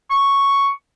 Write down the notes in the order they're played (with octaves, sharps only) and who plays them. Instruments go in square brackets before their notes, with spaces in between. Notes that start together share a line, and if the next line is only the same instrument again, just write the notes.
[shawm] C#6